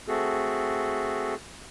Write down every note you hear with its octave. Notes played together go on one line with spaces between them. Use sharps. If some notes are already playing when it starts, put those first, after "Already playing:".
A3 C4 F#4 G#4 A4